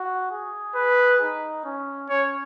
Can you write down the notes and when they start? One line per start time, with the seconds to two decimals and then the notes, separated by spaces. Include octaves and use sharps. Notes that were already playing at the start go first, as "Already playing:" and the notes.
Already playing: F#4
0.31 G#4
0.75 B4
1.21 D#4
1.65 C#4
2.09 C#4 C#5